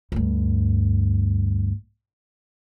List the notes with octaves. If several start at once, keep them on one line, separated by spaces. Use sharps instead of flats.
D2 G2